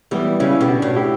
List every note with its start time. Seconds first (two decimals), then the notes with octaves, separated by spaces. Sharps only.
0.11 E3 G3 B3
0.39 C#3 C#4 E4
0.61 B2 G4
0.68 D4 F#4
0.82 A2
0.96 E4 G4